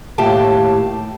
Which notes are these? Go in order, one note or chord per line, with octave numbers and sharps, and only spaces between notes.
D#2 A2 G4 F5 A5